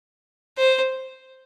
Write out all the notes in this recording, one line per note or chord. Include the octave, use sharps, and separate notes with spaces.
C5